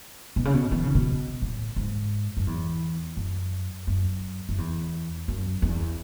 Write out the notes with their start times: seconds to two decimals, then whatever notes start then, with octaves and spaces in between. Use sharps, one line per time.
0.36 B2
0.45 C#3
0.54 B2
0.71 E3
0.83 C#3
0.95 B2
1.42 A2
1.76 G#2
2.37 F#2
2.47 E2
3.17 F#2
3.87 F#2
4.49 F#2
4.58 E2
5.28 F#2
5.62 E2